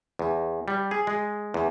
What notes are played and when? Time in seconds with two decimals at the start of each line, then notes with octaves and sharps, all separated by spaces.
0.19 E2
0.68 G3
0.91 G#4
1.07 G#3
1.54 E2